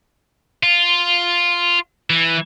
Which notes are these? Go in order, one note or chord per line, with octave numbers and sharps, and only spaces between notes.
F4
E3